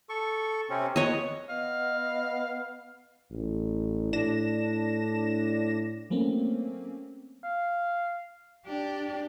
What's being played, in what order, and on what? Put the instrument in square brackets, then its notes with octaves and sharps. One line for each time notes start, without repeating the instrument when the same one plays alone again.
[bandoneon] A4 C#6
C3 C4 C#4
[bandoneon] B3 [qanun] C#5 D#5
[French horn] B3 [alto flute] D#5 [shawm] F5
[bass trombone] A1
[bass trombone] A2 [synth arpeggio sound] D4 A#6 E7
[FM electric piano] F#3 A3 A#3 C4 C#4
[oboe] F5
[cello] D4 G4